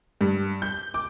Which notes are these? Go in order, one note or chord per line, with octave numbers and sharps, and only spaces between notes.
G2
G6
D6